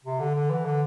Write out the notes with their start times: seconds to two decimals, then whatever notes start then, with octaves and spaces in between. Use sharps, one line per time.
0.05 C3
0.20 D3
0.35 D3
0.50 E3
0.65 D3